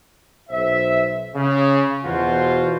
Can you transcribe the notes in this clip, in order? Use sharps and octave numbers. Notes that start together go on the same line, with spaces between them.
B1 C5 E5
C#3
E2 B2 F4 F#4 C5